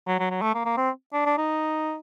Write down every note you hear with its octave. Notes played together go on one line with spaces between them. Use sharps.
F#3
F#3
F#3
A3
A#3
A#3
C4
D4
D4
D#4